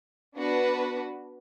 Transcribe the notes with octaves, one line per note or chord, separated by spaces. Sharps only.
B3 D4 F#4 B4